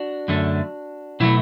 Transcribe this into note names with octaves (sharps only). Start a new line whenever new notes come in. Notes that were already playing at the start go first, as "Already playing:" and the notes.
Already playing: D4 F#4
F#2 D3 A3
B2 F#3 A3 E4